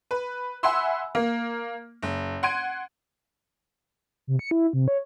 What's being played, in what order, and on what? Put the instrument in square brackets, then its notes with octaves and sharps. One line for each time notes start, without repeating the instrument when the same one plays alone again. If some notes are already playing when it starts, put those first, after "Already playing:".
[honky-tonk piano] B4
E5 F#5 G#5 B5 C6 E6
A#3
F#1
F#5 C6 G#6 D7 D#7
[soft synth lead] C3
C#7
E4
C3
C#5